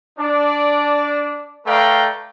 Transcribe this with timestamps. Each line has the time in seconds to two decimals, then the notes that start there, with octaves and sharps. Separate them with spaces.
0.19 D4 D5
1.66 A3 B4 D5 F5 G5 A#5